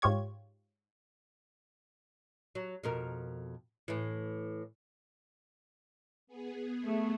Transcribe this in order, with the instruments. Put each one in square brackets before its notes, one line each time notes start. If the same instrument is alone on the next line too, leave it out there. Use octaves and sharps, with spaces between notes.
[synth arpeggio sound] G#2 F4 G4 C#5 G#6
[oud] F#3
F2 B2 A#4
A2 E3
[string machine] B3 G#4
[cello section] A3